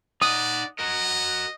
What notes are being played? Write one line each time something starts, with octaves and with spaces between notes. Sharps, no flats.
D#4 D5 F#5 D#6
F#4 A#4 D#5